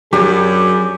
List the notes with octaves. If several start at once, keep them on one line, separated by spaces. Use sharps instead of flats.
F#2 F#3 D4 G4 G#4